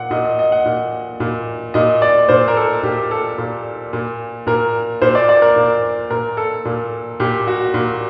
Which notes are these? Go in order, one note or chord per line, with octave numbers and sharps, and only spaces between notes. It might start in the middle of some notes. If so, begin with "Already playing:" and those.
Already playing: A#2 F#5
A#2 D#5
D#5
D#5
F#5
A#2
A#2
A#2 D#5
D5
A#2 C5
A#4
A4
A#2 G4
A4
A#2
A#2
A#2 A#4
A#2 C5
D5
D5
A#4
A#2
A#2 A#4
A4
A#2
A#2 G4
F#4
A#2